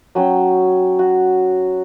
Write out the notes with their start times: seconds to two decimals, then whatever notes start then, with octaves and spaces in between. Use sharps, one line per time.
0.15 F#3 C#4 G5
0.99 F#4